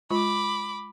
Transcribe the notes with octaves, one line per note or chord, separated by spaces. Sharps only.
G#3 F4 B5 D6